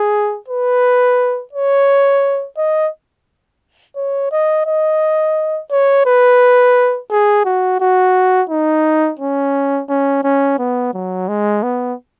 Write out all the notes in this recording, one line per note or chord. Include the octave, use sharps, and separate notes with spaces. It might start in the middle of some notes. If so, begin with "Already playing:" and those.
Already playing: G#4
B4
C#5
D#5
C#5
D#5
D#5
C#5
B4
G#4
F#4
F#4
D#4
C#4
C#4
C#4
B3
F#3
G#3
B3